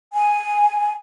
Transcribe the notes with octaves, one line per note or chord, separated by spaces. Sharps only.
G#5